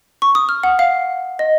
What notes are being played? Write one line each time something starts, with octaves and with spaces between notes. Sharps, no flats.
C#6
D#6
F6
F#5
F5
D#5